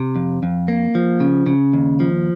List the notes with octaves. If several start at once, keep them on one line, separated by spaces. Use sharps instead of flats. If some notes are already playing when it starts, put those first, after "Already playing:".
Already playing: C3
F2
F2
A#3
F3
C#3
C#3
D#2
F3